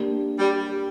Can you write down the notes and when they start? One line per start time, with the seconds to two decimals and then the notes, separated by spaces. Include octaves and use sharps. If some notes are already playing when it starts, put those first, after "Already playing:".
Already playing: A#3 D4 G4
0.39 G3